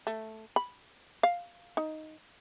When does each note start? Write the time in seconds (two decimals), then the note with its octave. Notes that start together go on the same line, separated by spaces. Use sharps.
0.07 A3
0.56 B5
1.23 F5
1.77 D#4